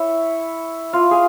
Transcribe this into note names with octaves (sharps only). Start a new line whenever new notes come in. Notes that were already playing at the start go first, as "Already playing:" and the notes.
Already playing: E4 C#5 E5
F4
G#4